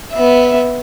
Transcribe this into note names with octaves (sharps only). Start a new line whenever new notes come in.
B3 E5